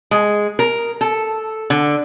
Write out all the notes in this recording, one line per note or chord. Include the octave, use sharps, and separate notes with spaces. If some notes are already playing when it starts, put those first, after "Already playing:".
G#3
A#4
A4
D3